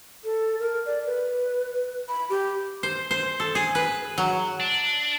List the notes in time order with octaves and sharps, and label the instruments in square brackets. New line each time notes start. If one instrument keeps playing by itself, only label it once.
[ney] A4
A#4
D5
B4
B5
G4
[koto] C5
C5
A4
G#4
B4
F#3
[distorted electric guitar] D4